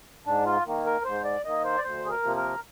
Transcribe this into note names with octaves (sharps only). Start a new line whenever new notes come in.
G#2 D4
F4
D#3 A#3
A#4
G#2 C5
D5
D#3 A#3 D#5
C5
D5
D2 C5
G#4
A#4
C3 F3 A#3
A#4